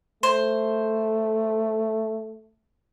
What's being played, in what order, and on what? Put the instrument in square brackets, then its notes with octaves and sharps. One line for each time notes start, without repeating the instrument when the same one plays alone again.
[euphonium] A3 [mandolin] C5